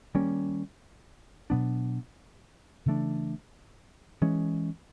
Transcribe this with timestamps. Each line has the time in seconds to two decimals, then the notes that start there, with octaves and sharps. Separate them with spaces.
0.14 D#3 G3 A#3 C#4
1.50 B2 F#3 B3 D4
2.86 C#3 E3 A3 D4
4.21 E3 G#3 C#4